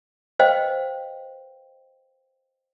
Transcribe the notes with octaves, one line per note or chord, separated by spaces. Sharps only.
B4 C5 D#5 F5 G5